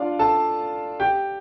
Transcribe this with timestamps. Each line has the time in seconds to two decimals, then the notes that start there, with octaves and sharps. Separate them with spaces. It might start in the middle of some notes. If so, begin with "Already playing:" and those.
Already playing: D4 F4 D5 F5
0.19 A4 A5
1.00 G4 G5